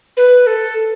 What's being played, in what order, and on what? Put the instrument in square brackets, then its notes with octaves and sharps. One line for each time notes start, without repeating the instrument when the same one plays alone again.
[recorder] B4
A4